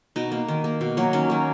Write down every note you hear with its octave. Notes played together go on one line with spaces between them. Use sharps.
B2 D#4
A#3
D#3
A#3
B2
F#3 A#3
D#3 C#4
F#3 A#3